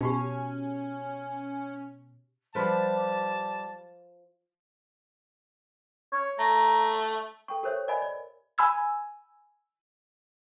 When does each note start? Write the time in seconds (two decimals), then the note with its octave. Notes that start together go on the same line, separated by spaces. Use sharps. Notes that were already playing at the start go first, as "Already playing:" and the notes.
0.01 B2 C#4 D#4 F#4 G4
2.55 F3 G3 F4 B4 A5
6.12 C#5
6.39 A3 A#5
7.48 A4 G5 C#6
7.63 G4 A4 A#4 C5 C#5 E5
7.88 A#4 D5 D#5 F5 G#5 B5
8.02 D5
8.58 G#5 B5 E6 G#6